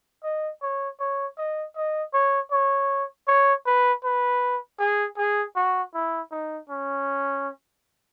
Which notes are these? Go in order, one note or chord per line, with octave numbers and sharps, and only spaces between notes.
D#5
C#5
C#5
D#5
D#5
C#5
C#5
C#5
B4
B4
G#4
G#4
F#4
E4
D#4
C#4